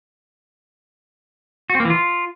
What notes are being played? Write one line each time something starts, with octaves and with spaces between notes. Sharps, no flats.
F#4
C4
A#3
E3
F4